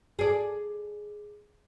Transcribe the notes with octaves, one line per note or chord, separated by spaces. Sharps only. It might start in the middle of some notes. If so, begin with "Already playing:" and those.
G#4 D5